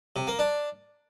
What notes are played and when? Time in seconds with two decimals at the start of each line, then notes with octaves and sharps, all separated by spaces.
0.16 C3
0.27 A#3
0.39 D4